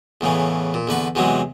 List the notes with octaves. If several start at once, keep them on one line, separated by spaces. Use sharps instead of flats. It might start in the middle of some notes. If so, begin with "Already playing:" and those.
E2 A2 C#3 E3
A#2
E2 D3 B4 C#6
E2 C3 E3 F#3 G#3